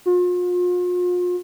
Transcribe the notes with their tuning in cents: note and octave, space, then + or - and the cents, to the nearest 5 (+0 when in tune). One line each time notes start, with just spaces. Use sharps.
F4 +40